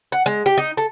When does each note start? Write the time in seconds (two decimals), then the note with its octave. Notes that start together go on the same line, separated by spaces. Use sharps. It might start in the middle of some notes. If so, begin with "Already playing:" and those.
0.12 F#5
0.26 G#3
0.46 G4
0.58 D#4
0.77 A4